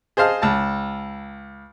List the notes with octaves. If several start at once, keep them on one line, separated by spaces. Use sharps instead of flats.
G#4 C5 D#5 F5 A5
C#2 A5